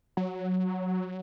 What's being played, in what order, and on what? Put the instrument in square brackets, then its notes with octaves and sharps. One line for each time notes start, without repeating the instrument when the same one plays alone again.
[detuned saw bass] F#3